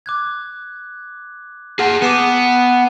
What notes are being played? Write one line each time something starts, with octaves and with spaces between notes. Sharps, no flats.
D6 F#6 G#6
G#4 F#5 G#5 A5 F6
B3 D6 C7 E7
D#6